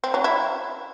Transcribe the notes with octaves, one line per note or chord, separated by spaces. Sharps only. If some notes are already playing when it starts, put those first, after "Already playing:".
C4
F#3
E4